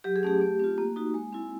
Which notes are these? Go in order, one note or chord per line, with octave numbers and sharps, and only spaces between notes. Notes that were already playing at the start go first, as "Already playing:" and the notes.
F#3 G4
G#4
A3 C#4 G4
A3
C4 F4
A#3
D#4 F#4
G#3
C4 E4